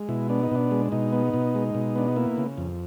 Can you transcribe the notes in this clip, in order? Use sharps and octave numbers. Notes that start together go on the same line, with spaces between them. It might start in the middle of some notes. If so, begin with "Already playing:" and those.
Already playing: G#3
B2 E4
B3 D4
D#4
B2 D4
G#3
B2 D#4
B3
B2
G#3
B2
B3 D4
D#4
A#3 E4
C#3
F2